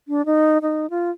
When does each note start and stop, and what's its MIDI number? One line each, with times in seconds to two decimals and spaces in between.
0.08 0.25 62
0.26 0.58 63
0.62 0.89 63
0.90 1.10 65